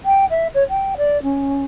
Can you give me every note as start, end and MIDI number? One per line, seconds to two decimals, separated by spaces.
0.05 0.25 79
0.30 0.47 76
0.54 0.63 73
0.70 0.94 79
0.97 1.21 74
1.22 1.64 61